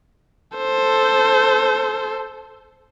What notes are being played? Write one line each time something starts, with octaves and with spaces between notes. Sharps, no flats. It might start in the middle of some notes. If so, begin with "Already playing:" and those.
A4 C5